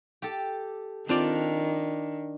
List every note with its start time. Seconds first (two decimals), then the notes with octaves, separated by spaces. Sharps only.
0.22 G4 A4
1.09 D#3 C4 D4 F4 D5